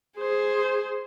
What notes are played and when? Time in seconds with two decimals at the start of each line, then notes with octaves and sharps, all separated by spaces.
0.18 G#4 C5